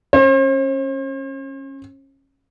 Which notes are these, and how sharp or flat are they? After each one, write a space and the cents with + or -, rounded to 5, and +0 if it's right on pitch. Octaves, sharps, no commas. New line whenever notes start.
C#4 -20 C5 +45